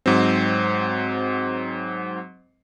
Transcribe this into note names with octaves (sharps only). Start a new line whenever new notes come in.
G#2 F#3 C4